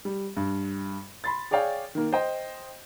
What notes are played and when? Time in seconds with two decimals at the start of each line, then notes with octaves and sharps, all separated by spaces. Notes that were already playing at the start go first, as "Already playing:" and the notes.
0.05 G3
0.37 G2
1.24 B5 C6 A6
1.51 G#4 C#5 D5 F5 G5
1.95 D#3 A#3
2.13 C5 D#5 G5